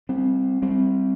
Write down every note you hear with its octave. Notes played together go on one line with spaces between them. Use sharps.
G3 C4
G3 C4